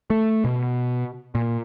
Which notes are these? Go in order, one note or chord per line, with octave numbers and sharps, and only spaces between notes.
A3
B2
A#2